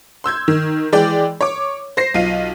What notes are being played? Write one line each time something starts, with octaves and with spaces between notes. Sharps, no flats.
C6 E6 G6 G#6
D#3
E3 G#3 D5 G5
C#5 D6
C5 A#6 C7
B1 F4 D#7